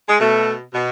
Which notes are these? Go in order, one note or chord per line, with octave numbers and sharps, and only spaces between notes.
G#3
B2 A3
B2